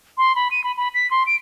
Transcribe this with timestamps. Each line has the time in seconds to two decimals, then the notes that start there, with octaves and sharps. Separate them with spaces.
0.18 C6
0.35 B5
0.51 D#7
0.64 B5
0.77 B5
0.94 B6
1.11 C6
1.26 D7